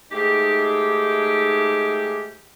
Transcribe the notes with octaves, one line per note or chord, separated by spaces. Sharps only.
G#2 A3 D#4 G4